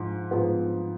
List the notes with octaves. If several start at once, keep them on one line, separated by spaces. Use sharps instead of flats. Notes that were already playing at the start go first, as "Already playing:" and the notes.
Already playing: G#2 F3
G#2 F3 B3